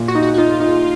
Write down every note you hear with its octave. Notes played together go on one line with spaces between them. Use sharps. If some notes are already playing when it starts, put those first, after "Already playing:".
Already playing: A#2
F#4
D#4
F#4
F#4
D#4 F4
D#4